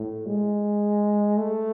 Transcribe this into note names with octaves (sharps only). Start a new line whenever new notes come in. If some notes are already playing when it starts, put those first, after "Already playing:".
Already playing: A2
G#3
A3